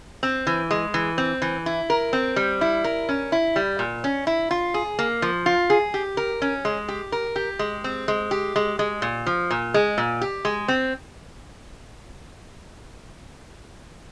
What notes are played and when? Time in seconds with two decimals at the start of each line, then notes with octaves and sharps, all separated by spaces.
0.23 C4
0.47 E3
0.71 G#3
0.94 E3
1.18 C4
1.42 E3
1.66 E4
1.90 A#4
2.13 C4
2.36 G3
2.61 E4
2.84 A#4
3.09 C#4
3.32 E4
3.56 G3
3.79 A#2
4.04 C#4
4.27 E4
4.51 F4
4.74 G#4
4.99 A#3
5.22 F3
5.46 F4
5.70 G#4
5.94 G4
6.17 A#4
6.42 C#4
6.65 G#3
6.88 G4
7.12 A#4
7.36 G4
7.59 G#3
7.84 C4
8.08 G#3
8.31 G4
8.56 G#3
8.79 G#3
9.02 A#2
9.26 F3
9.50 A#2
9.74 G#3
9.98 A#2
10.21 G4
10.45 G#3
10.68 C4